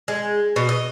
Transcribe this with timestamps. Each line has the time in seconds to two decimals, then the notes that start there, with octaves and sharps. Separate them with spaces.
0.08 G#3
0.56 B2
0.69 D#5